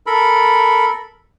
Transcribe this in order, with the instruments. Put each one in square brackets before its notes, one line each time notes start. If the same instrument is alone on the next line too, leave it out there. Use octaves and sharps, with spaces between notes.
[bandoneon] A4 A#4 B5